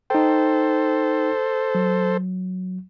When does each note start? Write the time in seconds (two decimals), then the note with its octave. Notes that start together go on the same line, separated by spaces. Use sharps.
0.10 D#4 A4 C5 G5
1.75 F#3